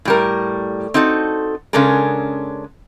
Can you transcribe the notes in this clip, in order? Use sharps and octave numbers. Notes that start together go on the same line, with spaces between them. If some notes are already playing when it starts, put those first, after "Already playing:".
A2 G3 A#4
C4 D#4 F#4 A4
C#3 G#3 C#4 D4 A4 A#4